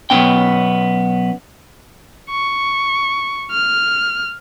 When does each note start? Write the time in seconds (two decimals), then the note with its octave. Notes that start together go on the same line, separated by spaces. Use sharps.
0.10 B1 F#2 B3 C#4 G5
2.30 C#6
3.52 F6